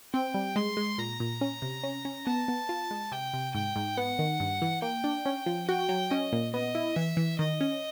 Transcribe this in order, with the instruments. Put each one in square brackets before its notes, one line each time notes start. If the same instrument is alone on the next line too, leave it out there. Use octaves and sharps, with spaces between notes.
[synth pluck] C4 [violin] G5
[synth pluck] G3
[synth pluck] G#3 [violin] C6
[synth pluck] G#3
[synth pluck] A#2 [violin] A#5
[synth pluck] A#2
C#4
C3
C#4
C#4
[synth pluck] B3 [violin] A5
[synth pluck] B3
F4
G#3
[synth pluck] C3 [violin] G5
[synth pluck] C3
[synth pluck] G#2 [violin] G5
[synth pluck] G#2
[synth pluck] B3 [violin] F#5
[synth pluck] D#3
G2
E3
[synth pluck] A#3 [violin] G5
[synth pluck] D4
C#4
F3
[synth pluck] F#4 [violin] G5
[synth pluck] F#3
[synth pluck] C#4 [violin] D#5
[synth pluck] A#2
[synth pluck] B3 [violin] D#5
[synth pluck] E4
[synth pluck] E3 [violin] E5
[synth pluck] E3
[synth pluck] D#3 [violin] D#5
[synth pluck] C#4